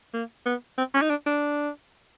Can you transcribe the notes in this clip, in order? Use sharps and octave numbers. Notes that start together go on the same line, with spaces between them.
A#3
B3
C4
C#4
D#4
D4
D4